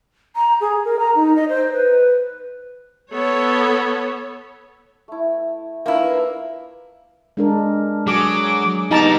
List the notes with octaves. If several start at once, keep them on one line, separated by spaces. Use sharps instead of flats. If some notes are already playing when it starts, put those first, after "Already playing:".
A#5
G#4
A#4
A#5
D#4
D#5
C5
B4
B3 A4 C#5
A3 E4
A#3 D4 E4 F4 B4
G#3 D4 A#4
F#3 G#4 D6
G3 B3 D#4 A5 A#5 D6